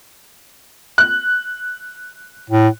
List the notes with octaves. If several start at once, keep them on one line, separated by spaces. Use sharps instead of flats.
F#6
A2